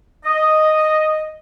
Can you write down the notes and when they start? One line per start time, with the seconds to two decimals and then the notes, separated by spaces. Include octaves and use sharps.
0.24 D#5